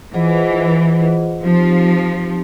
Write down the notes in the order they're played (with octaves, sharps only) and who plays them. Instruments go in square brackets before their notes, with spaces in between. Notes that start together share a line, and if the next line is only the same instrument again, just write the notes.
[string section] E3 [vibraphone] F4 G#4 C5 D#5 F#5
[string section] F3 [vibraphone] C4 D#4 G4 C5